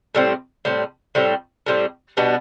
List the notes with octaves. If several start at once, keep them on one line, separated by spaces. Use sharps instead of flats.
A2 G3 C4
A2 G3 C4
A2 G3 C4
A2 G3 C4
B2 G3 B3 D4